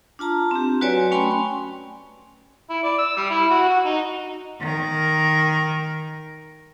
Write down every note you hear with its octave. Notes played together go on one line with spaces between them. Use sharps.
D4 F4 A5 A#5
C4 G4
F#3 F#4 B4 C#5 D5 G#5
A3 C#4 G5 G#5 B5 C6
E4
D5
E6
G3
E4
F#4
F#4
D#4
D#3 A#4